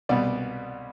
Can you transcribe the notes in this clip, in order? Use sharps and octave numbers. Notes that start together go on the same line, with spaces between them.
C2 B2 G3 B3 D5